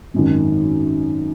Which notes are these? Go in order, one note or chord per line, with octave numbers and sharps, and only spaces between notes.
G#1 F#2 D#3